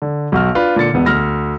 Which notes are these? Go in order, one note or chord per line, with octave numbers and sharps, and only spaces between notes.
D3
B1 F#4 F6
D4 F4 B4
A#2 D3 A6 C#7
E1 B3
D2 F6 A#6